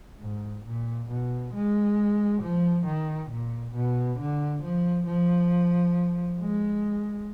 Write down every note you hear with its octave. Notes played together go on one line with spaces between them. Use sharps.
G#2
A#2
B2
G#3
F3
D#3
A#2
B2
D3
F3
F3
G#3